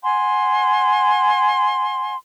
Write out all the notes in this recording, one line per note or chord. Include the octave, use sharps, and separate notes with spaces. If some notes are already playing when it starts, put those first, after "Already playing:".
F#5 G#5 C6